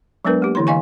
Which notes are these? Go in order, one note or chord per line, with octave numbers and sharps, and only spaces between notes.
F#3 G#3 B3 D4 A#4 B4
A#3 G4
D3 E3 E4 C#5 C6
E3 D#5 F5 G#5 C#6